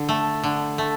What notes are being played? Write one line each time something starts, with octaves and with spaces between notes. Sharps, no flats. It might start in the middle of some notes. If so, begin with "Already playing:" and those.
Already playing: D3
A3
D3
A3